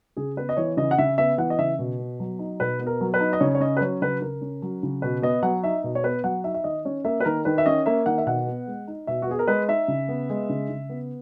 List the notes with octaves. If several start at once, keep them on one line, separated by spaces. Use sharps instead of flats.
C#3 G#4
B3 B4
D#5
E3 C#5
C#3 D#5
F#5
C#3 E5
B3 E5
E3 F#5
D#5
C#3 E5
B2
B3
F#3
D#4
B2 B4
B3
A#4
F#3
B4
D#4
D#5
C#3 C#5
C#5
C#4 D#5
B4
F#3 C#5
C#3 B4
C#3 A#4
C#4
F#3
C#3
B2 B4
B3 D#5
F#3 F#5
D#4 E5
B2
C#5
B3 B4
F#3 F#5
D#4 E5
E5
D#3 D#5
C#4 C#5
A#3 E5
B4
D#3 A#4
D#3 B4
E5
C#4 D#5
A#3 E5
D#3 F#5
E5
B2 F#5
B3
G#3
D#4
B2 E5
F#4
B3 G#4
A#4
G#3 B4
D#4 E5
C#3
B3
G#3
C#3
C#3
B3